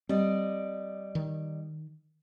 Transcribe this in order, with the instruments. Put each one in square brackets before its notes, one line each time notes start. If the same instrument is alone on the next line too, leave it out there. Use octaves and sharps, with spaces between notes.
[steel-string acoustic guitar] G3 D5 D#5 [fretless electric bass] C4
[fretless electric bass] D#3